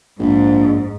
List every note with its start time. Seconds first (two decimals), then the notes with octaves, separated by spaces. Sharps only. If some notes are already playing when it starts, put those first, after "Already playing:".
0.19 A#1 G#2